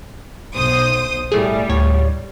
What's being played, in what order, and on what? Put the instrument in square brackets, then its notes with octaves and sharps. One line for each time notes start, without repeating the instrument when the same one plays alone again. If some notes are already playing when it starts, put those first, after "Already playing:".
[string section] B1 C5 D#6
[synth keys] A2 A3 G#4 [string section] G3
[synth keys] D2 A2 C#5